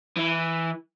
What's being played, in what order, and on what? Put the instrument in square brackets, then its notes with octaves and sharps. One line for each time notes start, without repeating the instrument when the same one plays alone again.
[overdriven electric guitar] E3